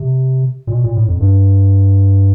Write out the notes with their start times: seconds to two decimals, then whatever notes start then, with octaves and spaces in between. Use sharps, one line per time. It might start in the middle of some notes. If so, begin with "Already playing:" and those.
Already playing: C3
0.67 A#2
0.71 B2
0.84 A#2
0.96 A2
1.08 F2
1.20 G2